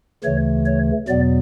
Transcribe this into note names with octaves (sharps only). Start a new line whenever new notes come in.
D2 C#3 E3 A3 C#5
C#5
E2 B2 F#3 B3 D5